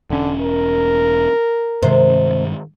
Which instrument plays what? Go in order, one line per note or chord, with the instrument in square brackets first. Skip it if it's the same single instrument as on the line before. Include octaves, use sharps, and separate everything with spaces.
[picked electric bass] E1 C#4 [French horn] D3
[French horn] A#4
[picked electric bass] G2 D#3 G#3 [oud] C3 C5